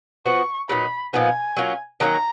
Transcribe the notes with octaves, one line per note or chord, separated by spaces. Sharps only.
F3 B3 F#4 C#6
A#2 F#3 B3 D#4 B5
A#2 F3 B3 D#4 G#5
F#3 A#3 C#4 F4
D#3 F#3 A#3 C#4 A#5